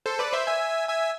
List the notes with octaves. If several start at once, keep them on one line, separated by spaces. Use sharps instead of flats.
A4 C5
B4 D5
C5 E5
E5 G#5
E5 G#5